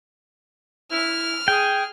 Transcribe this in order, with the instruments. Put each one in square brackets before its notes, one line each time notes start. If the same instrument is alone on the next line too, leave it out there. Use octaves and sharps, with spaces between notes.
[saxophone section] E4 [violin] F6
[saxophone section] G#4 [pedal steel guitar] G5